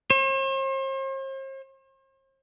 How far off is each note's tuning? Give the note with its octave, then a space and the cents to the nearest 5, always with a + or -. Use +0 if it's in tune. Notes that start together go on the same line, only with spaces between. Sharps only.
C5 +45